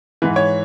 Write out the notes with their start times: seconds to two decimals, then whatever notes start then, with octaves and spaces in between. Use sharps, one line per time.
0.22 G#2 E3 B4
0.36 C#5